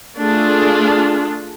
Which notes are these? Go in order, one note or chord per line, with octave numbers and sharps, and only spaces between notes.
A3 D4 F4 G#4